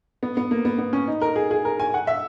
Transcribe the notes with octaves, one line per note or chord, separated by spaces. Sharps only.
B3
B3
A#3
B3
B3
C#4
D#4
A#4
G#4
G#4
A#4
G#5
F#5
E5